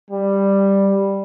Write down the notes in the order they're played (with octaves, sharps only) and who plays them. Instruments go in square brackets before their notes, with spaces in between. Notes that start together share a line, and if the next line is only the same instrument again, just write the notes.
[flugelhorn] G3